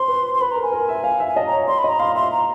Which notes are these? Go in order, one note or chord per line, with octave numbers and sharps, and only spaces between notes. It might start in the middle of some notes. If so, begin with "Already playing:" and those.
Already playing: C5 C6
B4
C6
B4 B5
A#4 A#5
G#5
A#4
E5
F5
E5
G#5
D#5 A5
A#5
C#5
D5 C6
B5
D#5 A#5
F5 C6
E5 C6
A#5